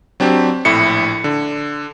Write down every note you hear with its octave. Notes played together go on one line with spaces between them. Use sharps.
F#3 C4 D4 G4
A#1 A2 E4 C#7
D3